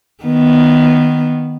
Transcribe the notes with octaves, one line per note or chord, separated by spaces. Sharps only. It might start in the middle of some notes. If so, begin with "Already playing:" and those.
D#3 B3